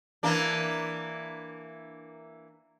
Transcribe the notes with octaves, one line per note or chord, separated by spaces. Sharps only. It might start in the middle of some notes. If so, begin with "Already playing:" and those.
E3 A#3 D4